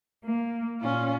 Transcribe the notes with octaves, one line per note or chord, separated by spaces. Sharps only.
A#3
A#2 C#4 F4